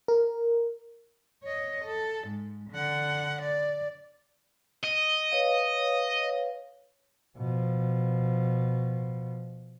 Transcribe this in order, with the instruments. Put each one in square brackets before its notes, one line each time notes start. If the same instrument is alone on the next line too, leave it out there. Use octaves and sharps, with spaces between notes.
[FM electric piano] A#4
[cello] C#5 D#5
A4
G#2
D3 F#5
D5
[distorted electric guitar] D#5
[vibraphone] B4 C#5 F5
[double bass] B2 F3